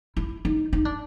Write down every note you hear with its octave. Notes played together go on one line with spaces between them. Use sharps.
E4
D#4
D#4
D4